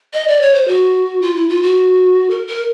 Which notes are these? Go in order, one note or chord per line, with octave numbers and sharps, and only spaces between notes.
D#5
D5
C#5
C5
F#4
F4
E4
F4
F#4
A#4
A#4